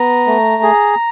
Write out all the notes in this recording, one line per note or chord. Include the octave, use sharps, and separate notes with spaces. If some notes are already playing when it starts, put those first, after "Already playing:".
Already playing: B3 A#5
A3
G#4